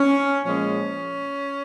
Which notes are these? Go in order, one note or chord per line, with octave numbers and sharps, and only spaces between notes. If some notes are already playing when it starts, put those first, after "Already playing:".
Already playing: C#4
A#2 F3 G#3 C#4